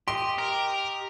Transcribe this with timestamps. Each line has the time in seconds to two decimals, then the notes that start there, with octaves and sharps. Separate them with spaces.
0.08 G4 D#5 C6
0.39 A#4